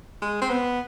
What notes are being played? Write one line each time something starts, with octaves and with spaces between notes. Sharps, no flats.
G#3
C4
B3